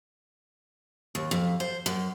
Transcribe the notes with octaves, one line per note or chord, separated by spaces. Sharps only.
D#2
F2
C5
F#2